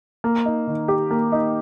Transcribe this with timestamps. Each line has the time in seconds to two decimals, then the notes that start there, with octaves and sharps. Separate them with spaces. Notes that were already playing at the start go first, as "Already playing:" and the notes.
0.24 A#3
0.45 D#4
0.67 D#3
0.88 G4
1.11 A#3
1.32 D#4